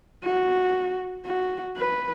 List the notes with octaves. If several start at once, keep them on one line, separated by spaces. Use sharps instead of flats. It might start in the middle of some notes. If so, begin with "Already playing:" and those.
F#4
F#4
B4